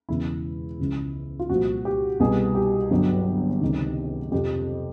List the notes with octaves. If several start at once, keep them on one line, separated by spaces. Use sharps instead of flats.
E1 E2 C#3 E4
C#2 C#3 F3
F4
C2 A#2 F3 F#4
G4
C2 B2 G3 G#4
G4
G1 G2 D3 F#3
C#2 C3 D#3
F2 C3 F3 G4